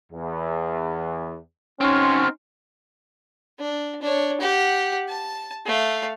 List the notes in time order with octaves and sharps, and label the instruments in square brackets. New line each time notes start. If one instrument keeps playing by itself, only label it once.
[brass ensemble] E2
[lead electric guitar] C4 F#4 [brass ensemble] C#4 [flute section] D#4 C6 F6
[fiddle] D4
D4 C#5
G4 F#5
A5
A3 F5